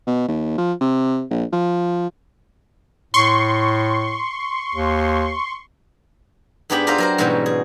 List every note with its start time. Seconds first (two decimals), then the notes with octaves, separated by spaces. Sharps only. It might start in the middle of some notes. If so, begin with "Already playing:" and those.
0.07 B2
0.28 D#2
0.58 F3
0.81 C3
1.30 A#1
1.53 F3
3.14 A2 C6 C#6
4.74 D#2
6.70 G#2 B3 D4 G4 G#4 B5
6.87 F4 G4 A#4 C5 E5 F5
6.98 F#3 A#4 C5
7.18 G#2 B2 E3 F#3 G3 C#4
7.46 G#4